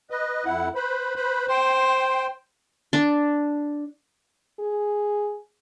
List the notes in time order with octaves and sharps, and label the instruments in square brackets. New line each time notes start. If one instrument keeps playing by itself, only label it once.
[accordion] B4 D#5
F2 E4 F#5
B4 C5 B5
B4 C5 B5
[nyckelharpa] C5 [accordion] G5 C6
[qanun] D4
[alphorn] G#4